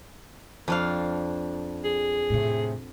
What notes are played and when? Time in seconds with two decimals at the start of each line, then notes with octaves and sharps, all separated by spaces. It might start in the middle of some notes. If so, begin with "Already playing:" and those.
0.68 F2 D4 F5
1.84 G#4
2.30 A2 C3